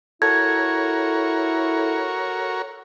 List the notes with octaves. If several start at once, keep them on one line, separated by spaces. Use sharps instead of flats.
E4 F#4 A4 A#4 C#5 G#6